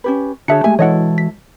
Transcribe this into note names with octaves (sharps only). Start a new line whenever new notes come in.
C#4 G4 B4
D3 F#4 G#4 C#5 E5 A5 C#7
G#3 A3 G4 E5 G#5
E3 G#3 E4 F#4 A4 C#5 D#5 F#5
B6